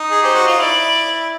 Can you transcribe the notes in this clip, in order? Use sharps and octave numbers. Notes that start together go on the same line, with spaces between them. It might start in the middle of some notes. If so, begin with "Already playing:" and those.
Already playing: D#4
G#4
G4 C5
F#4
F4
E4 D5